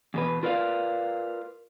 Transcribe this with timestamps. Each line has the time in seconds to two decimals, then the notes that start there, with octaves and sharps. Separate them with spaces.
0.14 E2 B2 B4
0.43 F4 A#4 B4 D5 F5